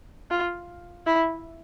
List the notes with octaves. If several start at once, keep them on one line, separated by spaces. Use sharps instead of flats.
F4
E4